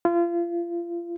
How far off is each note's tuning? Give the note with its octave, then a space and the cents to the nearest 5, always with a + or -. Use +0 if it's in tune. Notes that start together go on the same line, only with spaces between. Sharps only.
F4 -30